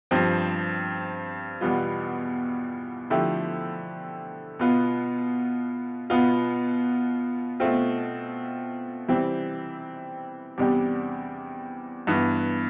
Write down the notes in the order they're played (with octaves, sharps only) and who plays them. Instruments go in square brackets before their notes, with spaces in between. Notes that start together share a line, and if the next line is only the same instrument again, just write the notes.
[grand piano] G2 F3 C4 G4
E2 B2 G3 B3 F4
D3 F3 A3 E4 G4
B2 B3 F4
B2 B3 F4
B2 A3 C4 F4
C3 E3 G3 C4
E2 C3 G3 D4 G4
G2 E3 B3